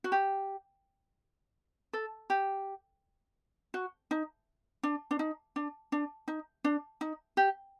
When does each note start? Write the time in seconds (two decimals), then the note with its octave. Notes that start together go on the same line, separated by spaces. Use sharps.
0.04 F#4
0.12 G4
1.93 A4
2.30 G4
3.74 F#4
4.11 D#4
4.83 D4
5.11 D4
5.19 D#4
5.56 D4
5.92 D4
6.28 D#4
6.64 D4
7.01 D#4
7.37 G4